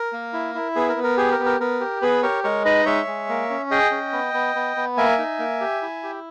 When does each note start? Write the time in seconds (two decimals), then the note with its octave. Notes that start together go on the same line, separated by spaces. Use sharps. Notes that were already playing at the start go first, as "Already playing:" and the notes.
Already playing: A#4
0.13 A#3
0.33 E4
0.55 E4
0.75 B3 G#4
0.89 A#4
0.96 B3
1.03 A#4
1.17 G4 G#4
1.32 A#4
1.39 B3
1.46 A#4
1.60 B3 A#4
1.80 G4
2.02 B3 G#4 B4
2.23 G4 A#4 C#5
2.44 G#3 A#4 C#5
2.65 D#4 B4 D#5
2.86 G#3 C#5 E5
3.07 G#3
3.29 A#3
3.50 C#4
3.71 G#4 D#5 G5
3.91 C#4
4.12 B3
4.34 B3
4.55 B3
4.76 B3
4.97 A#3 E5 G#5
5.18 D#4
5.39 A#3
5.61 G4
5.82 E4
6.03 G4